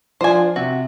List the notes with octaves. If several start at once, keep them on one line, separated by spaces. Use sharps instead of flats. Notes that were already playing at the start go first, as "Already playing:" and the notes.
F3 D4 F4 C5 G#5
C3 F#4